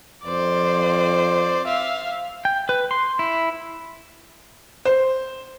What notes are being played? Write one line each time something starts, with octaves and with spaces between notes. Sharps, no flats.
F2 C5 D5
E5 F5
G5
B4
C6
E4
C5